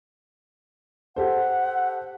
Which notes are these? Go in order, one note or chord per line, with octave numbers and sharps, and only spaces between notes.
G4 A4 C5 F#5